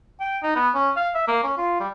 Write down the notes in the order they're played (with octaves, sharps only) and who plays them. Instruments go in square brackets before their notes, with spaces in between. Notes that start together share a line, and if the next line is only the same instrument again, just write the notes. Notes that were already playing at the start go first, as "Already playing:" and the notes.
[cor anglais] G5
D#4
B3
C#4
F5
E5
A#3
C#4
F4
G3